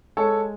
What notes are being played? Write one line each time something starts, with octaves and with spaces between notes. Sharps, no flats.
G#3 A4 C#5